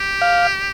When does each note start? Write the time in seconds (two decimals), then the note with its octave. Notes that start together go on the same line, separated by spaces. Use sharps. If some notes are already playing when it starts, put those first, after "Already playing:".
Already playing: G4
0.22 F5